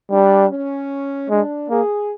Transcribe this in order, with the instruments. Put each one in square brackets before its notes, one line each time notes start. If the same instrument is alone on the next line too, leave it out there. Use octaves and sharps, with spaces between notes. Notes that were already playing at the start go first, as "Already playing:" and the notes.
[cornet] G3 [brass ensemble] D4
[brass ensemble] C#4
[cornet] G#3 [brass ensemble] D4
[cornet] A#3 [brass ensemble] G#4